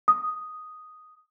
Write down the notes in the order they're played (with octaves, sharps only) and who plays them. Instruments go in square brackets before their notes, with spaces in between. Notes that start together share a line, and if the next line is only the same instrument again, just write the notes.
[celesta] D#6